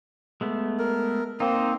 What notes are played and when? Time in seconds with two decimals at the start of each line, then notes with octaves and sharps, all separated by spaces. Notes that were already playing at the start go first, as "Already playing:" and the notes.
0.41 G#3 A3 B3
0.79 A#4
1.40 A#3 C4 D#4 C5